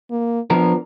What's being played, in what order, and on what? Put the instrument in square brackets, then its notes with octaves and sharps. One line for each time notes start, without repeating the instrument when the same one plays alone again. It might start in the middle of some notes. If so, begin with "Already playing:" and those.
[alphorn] A#3
[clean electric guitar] F3 D4 A#4 [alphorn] B3